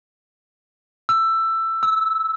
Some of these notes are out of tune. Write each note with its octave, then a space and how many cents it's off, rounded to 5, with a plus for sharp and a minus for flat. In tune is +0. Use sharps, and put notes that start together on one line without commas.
E6 +15
E6 -15